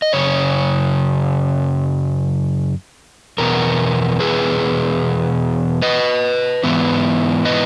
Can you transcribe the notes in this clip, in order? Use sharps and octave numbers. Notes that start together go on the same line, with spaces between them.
D#5
F#2 C#3 C#5
E2 B2 B3 A#4
G#4 B4
B4 D#5
G#2 E3 B3 E4
B4 D#5